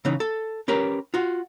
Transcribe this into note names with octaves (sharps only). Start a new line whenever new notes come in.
C#3 E3 C#4 D#4
A4
C#4 G4 A#4 B4
F4 F#4